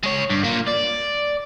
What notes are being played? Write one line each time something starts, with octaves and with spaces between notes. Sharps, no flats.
G#3 C#5
G2
A#3 F4
D5